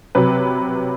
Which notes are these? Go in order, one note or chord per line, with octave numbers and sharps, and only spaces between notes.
C3 F#3 B4